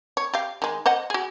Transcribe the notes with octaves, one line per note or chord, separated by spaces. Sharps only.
C#5
G4 F5
D#3 G#3
C5 D#5 F#5
F#4 G#4